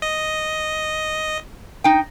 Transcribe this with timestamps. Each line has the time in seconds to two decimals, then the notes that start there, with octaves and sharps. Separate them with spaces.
0.02 D#5
1.84 D#4 G5